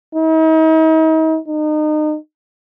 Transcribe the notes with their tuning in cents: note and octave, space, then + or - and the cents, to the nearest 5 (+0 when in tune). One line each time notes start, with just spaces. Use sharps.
D#4 +40
D#4 -30